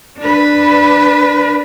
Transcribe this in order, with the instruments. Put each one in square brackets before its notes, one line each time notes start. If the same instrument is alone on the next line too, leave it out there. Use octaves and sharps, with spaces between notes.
[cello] D4 B4